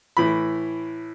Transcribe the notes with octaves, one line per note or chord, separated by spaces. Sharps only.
A2 E3 B5